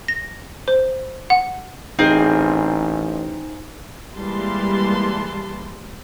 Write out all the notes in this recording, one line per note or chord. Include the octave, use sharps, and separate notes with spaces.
A#6
C5
F#5
A1 C4 D#4 G#4 A#4
E3 G3 G#3 A#3 A5 C6